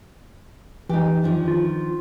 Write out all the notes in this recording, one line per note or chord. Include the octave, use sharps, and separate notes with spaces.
E3 D#4 G4
D#3 F3 D4
F4